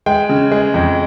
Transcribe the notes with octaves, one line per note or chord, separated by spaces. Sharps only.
G#3 G5
C#3
G#3
F2